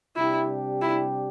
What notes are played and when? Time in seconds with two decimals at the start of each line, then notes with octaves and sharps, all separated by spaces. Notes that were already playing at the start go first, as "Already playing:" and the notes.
0.16 C3 G3 D4 E4 G4
0.82 E4